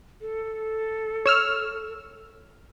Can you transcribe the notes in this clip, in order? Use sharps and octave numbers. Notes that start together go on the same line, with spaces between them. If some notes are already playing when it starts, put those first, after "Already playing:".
A4
C#5 E6 F6